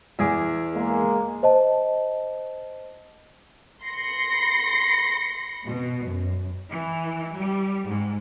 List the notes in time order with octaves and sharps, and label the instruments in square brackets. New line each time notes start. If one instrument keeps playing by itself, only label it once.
[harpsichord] E2 G#4 D6
[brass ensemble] G#3 A#3
[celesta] C5 D#5 A5
[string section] B5 C6 A#6 C7 C#7
B2
F#2
[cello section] E3
G3
G#2